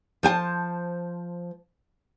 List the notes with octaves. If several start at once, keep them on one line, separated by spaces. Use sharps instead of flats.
F3 C5 G#5 A5